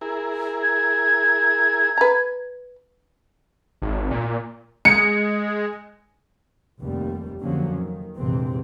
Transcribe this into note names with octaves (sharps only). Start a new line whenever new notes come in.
E4 G#4 A#4
G#6
B4 A#5
G#1
A#2
G#3 C#7
F1 D#2 G3
F2 D3 F3 F#3 A#3 C#4
D#3
A#1 F2 G#2 C3 E3 C4